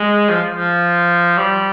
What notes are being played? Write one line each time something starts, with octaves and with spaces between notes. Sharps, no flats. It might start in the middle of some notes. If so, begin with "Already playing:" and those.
Already playing: G#3
F3
F3
G3